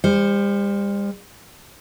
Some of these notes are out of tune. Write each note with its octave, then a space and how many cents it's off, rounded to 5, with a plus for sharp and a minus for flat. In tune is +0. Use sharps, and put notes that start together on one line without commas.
G3 +40 C5 +0